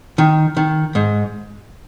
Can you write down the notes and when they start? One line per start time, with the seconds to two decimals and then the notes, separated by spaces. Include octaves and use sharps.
0.18 D#3
0.57 D#3
0.95 G#2